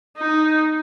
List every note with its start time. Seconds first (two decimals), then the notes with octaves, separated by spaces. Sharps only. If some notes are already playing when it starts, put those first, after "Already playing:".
0.17 D#4